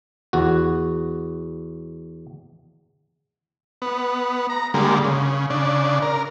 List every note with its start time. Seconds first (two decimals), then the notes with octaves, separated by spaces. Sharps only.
0.33 E2 F#4
3.82 B3
4.50 A#5
4.74 D3 G3 G#3 A#3
5.04 C#3
5.50 C#3 D4
6.02 A#4